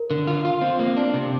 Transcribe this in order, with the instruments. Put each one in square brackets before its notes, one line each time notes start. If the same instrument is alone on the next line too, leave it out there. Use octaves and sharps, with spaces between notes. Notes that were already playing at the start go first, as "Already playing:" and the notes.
Already playing: [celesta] A#4
[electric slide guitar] D3
F4
F4
C4
[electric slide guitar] A#3 [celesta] C5
[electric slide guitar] D4
C3